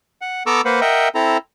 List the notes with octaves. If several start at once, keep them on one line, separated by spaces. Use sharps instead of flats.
F#5
B3 A4 A#5 C#6 D6 E6
A#3 B4 C5 F#5
A#4 D#5 E5 F#5 G5
C4 E4 A4 A#5